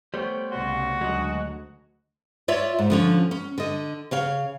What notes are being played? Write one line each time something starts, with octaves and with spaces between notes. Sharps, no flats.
G3 A3 B3 C5 C#5 G5
C2 C#3 F#4 D5 C6
D2 F#3 G#3 D#5
F4 C#5 D5 E5
G#2
D3 F3 C#4
C#4
D3 D#5
C#3 C#5 F5